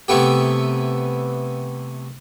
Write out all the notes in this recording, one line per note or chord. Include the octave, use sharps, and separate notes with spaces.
C3 E3 A3 B3 G4